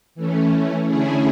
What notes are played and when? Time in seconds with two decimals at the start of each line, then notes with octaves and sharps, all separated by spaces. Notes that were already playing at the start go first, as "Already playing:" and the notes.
0.15 E3 A3 C#4
0.86 D3 A3 C#4 E4 G#4